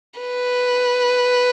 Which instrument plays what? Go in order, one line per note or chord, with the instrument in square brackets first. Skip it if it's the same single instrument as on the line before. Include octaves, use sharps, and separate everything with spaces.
[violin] B4